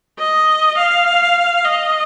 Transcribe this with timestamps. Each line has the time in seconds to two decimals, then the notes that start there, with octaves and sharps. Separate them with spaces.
0.19 D#5
0.78 F5
1.65 D#5